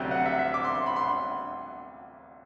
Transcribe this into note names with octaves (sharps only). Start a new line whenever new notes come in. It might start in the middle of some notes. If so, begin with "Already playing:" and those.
Already playing: D2 C3 F#3 G5
F#5
E5
E5
D6
C6
C6
B5
C6